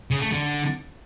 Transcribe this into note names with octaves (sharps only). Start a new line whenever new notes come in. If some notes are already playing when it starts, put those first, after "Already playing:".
C#3
A3
D3